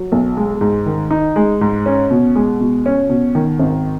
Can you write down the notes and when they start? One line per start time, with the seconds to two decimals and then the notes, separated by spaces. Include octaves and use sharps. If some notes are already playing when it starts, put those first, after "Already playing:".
Already playing: F#3
0.12 B1
0.37 G#3
0.61 G#2
0.86 D#3
1.11 D#4
1.36 G#3
1.61 G#2
1.86 C#4
2.11 B2
2.35 G#3
2.60 B2
2.86 C#4
3.10 B2
3.35 D#3
3.59 G#1